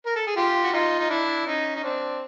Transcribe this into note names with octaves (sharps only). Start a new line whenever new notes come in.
A#4
A4
G#4
F4 G4
F#4
D#4 F4
D#4
D4 E4
C#4 D#4
D#4
C4 D4